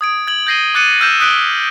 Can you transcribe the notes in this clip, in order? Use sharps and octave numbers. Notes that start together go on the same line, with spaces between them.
D#6 G#6 D7
G#6 F#7
G6 G#6 A#6 C7 D#7 G7
D6 F#6 A6 C#7 D#7
E6 F6 G6 A#6 E7
D#6 F#6 B6 D7 G7